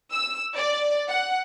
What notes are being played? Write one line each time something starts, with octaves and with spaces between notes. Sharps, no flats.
E6
D5
F#5